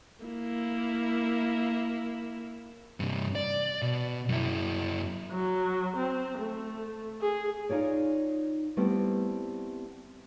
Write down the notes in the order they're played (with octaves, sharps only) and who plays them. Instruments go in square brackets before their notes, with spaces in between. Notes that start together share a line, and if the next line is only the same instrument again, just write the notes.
[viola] A#3 E4
[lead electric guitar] G2 C3
D5
B2
F#2 E4
[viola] F#3
C4
A3
G#4
[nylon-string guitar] D#4 F4 C#5 D5
G3 A3 B3 C4 E4